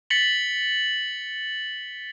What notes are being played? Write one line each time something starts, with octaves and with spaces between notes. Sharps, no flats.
A6 B6 C#7 F#7 G7